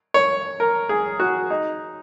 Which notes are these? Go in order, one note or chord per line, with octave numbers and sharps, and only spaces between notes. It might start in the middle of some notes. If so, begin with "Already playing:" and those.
C#5
A#4
G#4
F#4
D#4